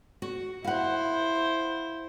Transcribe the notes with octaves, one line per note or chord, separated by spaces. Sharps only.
F#4
E4 C5 F5 F#5